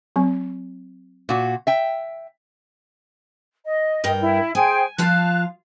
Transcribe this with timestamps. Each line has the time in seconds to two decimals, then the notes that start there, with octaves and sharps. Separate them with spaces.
0.16 F#3 C4
1.29 A#2 F#4
1.67 E5 G5
3.64 D#5
4.04 G2 A#4 G5
4.20 E4
4.55 G#4 C5 G5 G#5
4.98 F3 F4 F5 A5 F#6